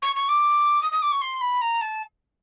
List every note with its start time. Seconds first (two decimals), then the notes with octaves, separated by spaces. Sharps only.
0.02 C#6
0.15 C#6
0.28 D6
0.81 D#6
0.91 D#6
1.02 D6
1.11 C#6
1.21 C6
1.40 B5
1.61 A#5
1.81 A5